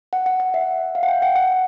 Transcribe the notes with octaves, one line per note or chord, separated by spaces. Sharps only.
F#5
F#5
F#5
E5
F5
F#5
G5
F#5
F#5